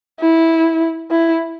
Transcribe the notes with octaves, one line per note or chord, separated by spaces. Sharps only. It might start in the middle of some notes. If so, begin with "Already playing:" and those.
E4
E4